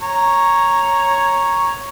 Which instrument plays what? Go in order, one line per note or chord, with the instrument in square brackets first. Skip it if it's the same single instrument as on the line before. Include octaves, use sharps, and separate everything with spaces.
[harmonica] C#5 A#5